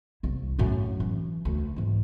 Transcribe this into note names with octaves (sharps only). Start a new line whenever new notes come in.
C2 E4
F#2 A2
E3
D2
G#2 E3